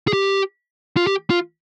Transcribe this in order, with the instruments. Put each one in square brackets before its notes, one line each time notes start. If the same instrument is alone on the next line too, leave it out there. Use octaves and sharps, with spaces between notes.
[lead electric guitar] G#4
G4
F4
G4
F4